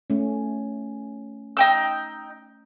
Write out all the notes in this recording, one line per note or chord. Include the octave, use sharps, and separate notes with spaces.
A3 C#4
D#4 G5 E6